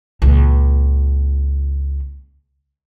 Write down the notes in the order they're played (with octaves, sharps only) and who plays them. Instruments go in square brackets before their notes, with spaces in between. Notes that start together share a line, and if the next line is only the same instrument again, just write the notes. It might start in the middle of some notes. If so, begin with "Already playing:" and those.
[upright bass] C#2 A#2